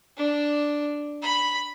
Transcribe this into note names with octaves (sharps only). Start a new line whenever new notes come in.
D4
B5